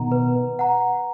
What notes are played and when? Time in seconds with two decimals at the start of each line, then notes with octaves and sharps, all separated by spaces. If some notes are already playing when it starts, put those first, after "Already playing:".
Already playing: B2 D#3 F#5 A#5
0.12 B4
0.59 F#5 A#5